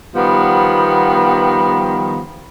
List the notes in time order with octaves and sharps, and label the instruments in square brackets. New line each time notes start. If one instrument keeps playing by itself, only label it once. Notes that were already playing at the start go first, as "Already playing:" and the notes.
[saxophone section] D#3 F3 G3 B3